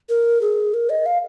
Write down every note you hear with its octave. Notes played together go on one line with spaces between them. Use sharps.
A#4
G#4
A#4
D#5
F5